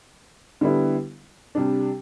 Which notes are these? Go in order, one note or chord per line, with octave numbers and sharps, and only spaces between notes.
D3 G3 B3 E4
C3 G3 D4